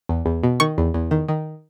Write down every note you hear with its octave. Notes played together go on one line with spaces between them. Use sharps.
E2
E2
B2
D#3 C#6
E2
E2
D#3
D#3